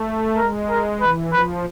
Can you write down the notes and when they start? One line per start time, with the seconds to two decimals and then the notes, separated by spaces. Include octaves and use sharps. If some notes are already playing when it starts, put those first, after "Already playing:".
Already playing: A3
0.37 G#3 A#4
0.69 A#4
1.01 E3 B4
1.32 F3 B4